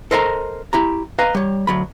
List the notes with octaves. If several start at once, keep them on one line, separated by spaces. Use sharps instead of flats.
A4 A#4 C5 D#5 G5 A#5
E4 G4 A#5
B4 D#5 F5 G#5 A#5
G3 C#5
D2 F#3 B5